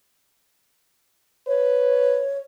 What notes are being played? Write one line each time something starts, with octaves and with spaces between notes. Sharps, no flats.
B4 C#5